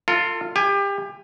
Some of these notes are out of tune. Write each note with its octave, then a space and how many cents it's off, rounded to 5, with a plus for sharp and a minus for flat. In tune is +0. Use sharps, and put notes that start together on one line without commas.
F4 +0 A4 +40
G4 +30 G#5 +0